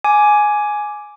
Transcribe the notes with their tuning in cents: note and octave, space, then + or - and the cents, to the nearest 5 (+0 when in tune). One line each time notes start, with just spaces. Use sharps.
G#5 +10 D6 +0